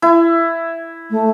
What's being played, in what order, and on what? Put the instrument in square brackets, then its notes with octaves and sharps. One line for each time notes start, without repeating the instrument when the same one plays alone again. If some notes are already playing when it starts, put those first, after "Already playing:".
[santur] E4
[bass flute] A3